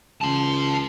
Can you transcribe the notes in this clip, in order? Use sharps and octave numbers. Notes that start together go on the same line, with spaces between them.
C#2 A5 C6